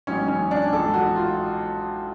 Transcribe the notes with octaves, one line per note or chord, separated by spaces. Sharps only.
A1 G#2 F#3 C#4
C#4
D4
A1 G#2 F3 A4
F#4
F4